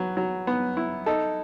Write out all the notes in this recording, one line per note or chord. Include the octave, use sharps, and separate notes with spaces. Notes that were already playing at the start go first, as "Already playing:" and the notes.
Already playing: F#3 B4
F#3
B3
E4
D#4 A4